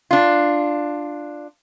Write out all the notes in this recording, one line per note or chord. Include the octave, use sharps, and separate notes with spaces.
D4 F4